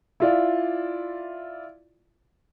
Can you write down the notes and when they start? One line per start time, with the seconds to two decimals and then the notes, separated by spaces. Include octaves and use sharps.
0.20 E4 F4 D5